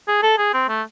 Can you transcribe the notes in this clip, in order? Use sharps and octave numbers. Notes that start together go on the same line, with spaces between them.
G#4
A4
G#4
C4
A3